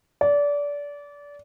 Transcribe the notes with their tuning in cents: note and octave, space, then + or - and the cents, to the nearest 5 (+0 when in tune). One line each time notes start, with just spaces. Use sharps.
D5 -25